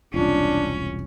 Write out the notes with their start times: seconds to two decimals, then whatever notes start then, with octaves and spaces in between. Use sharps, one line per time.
0.14 E1 C2 C#4 D4 F4